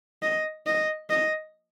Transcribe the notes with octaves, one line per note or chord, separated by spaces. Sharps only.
D#5
D#5
D#5